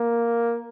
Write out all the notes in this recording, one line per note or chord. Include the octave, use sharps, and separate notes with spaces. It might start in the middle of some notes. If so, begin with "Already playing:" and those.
Already playing: A#3